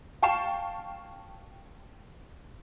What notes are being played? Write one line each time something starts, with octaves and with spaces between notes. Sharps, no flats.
F5 G5 A5 C#6 C7 E7